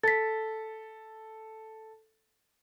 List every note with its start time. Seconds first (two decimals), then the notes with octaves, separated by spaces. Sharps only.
0.03 A4 A6 B6